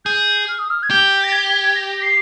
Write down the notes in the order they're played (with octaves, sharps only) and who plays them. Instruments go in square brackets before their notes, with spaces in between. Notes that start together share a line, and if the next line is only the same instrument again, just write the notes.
[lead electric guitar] G#4 [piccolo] G6
[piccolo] F6
D#6
F6
G#6
[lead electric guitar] G4 [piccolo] G6
[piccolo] A#6
G#6
A#6
C7